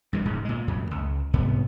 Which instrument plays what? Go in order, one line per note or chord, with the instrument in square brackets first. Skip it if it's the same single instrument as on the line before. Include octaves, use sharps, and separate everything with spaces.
[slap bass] G2 E3 G#3
D#1 G#2 C#3
A#2 G#3
F#2 A#2 C#3
C#2
C2 G#2 C3 B3